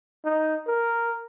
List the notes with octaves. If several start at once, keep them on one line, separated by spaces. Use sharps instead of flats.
D#4
A#4